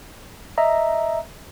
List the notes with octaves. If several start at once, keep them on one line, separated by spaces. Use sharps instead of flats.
D#5 E5 A#5